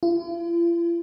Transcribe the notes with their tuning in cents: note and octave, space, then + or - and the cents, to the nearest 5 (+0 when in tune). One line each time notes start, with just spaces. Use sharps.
F4 -45